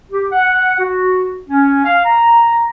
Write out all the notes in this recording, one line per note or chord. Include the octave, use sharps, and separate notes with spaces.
G4
F#5
F#4
C#4
F5
A#5